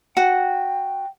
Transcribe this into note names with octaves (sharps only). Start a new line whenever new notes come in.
F#4 F#5 G5